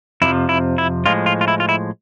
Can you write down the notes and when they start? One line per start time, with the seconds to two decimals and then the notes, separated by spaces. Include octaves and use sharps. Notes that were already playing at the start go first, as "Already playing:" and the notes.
0.22 F2 C3 F3 E4
0.49 E4
0.78 E4
1.06 A2 F3 G#3 F4
1.26 F4
1.41 F4
1.48 E4
1.60 F4
1.69 E4